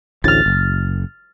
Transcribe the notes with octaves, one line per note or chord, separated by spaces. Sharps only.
A1 D2 A2 F6 A6
F#1